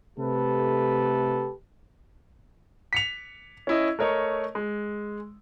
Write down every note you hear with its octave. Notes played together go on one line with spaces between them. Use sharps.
C3 A3 G4 A4 B4
B6 C#7 F7
C#4 E4 D#5
A3 A#4 C#5 D#5
G#3